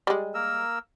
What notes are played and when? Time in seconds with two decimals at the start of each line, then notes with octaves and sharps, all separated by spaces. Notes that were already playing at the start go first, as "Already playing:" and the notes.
0.07 G3 G#3
0.34 A#3 A#4 E6